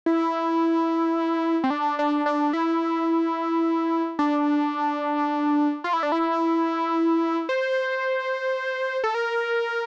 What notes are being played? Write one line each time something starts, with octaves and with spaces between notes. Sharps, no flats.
E4
C4
D4
D4
D4
E4
D4
F4
E4
D4
E4
C5
A4
A#4